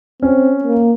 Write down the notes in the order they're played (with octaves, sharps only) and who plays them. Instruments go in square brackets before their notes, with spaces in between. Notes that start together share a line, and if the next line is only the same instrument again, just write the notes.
[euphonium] C4 [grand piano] C#4
[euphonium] A#3